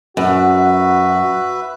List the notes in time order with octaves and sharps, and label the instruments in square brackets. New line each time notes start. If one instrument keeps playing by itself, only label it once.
[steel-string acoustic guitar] F#2 [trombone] F#4 [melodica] B4 E5